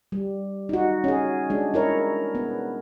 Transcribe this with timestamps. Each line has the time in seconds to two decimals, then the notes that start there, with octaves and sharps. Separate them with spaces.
0.12 G3
0.69 D#4 F#4
1.04 C#4 G#4
1.50 G#3 D4
1.74 E4 A#4 C#5
2.35 B3